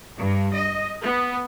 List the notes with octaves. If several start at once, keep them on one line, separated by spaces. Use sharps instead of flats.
G2
D#5
B3